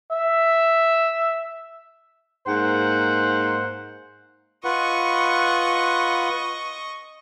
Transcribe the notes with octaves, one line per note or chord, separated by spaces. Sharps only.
E5
G#2 A#3 C5 F#5
F4 B4 D#5 F#5 C#6